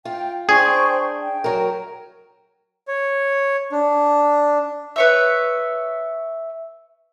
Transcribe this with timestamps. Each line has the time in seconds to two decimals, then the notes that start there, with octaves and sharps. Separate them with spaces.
0.05 F4 G5
0.49 D4 G#4 C5 G5 C#6
1.22 G5
1.44 F#3 A#4
2.88 C#5
3.72 D4
4.96 B4 C#5 E5